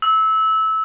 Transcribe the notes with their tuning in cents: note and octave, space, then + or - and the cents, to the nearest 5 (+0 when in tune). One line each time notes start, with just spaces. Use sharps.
E6 -20